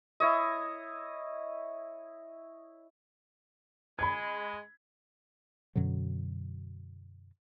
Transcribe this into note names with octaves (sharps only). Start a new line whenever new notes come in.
E4 C#5 D#5
G#3 B5 G#6
F#2 B2 D3 F#3